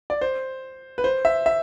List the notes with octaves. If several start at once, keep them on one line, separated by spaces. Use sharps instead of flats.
D5
C5
B4
C5
E5
E5